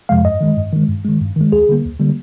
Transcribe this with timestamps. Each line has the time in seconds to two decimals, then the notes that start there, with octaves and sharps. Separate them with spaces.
0.09 F2 C3 F3 G#3 F5
0.25 G2 D#5
0.41 D#3 G#3
0.57 G2
0.73 D#3 G#3
0.89 G2
1.05 D#3 G#3
1.21 G2
1.36 D#3 G#3
1.52 D2 G#4
1.69 D3 G3 A#3
1.85 D2
1.99 D3 G3 A#3